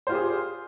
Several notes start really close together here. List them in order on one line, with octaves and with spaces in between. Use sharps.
C5 F4 G4 G#4